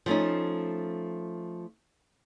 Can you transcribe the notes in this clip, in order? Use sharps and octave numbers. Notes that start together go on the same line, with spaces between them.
F3 A3 C#4 D#4